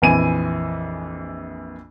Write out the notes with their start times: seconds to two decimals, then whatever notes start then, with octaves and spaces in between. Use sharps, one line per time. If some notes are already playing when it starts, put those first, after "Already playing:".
0.02 A#1 F2 E3 G#5 D#7